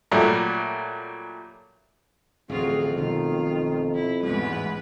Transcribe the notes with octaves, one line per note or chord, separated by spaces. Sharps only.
A#2 F#3 G3 A3
D1 A1 F2 F#3 C4 F4 G#4
B1 B2 D#3 A3 F4
E4
A1 E2 G#2 B2 G3 G#3 B4